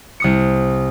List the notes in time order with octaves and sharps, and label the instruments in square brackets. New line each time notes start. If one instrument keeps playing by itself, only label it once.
[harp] C2 D#6 C#7